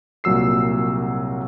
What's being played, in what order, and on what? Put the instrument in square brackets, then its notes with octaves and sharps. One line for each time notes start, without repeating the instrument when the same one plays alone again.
[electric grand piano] C2 A#2 F#3 E6 C7